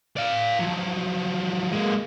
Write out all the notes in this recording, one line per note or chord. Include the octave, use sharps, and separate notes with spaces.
D5 F5
F3 F#3
G#3 A#3